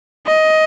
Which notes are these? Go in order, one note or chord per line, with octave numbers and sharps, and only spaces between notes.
D#5